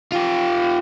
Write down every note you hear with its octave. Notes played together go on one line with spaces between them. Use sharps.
F4 G4